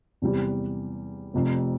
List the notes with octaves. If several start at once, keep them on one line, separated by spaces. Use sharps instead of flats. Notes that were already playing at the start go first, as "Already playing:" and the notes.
E2 C3 G3
F1 F2 C3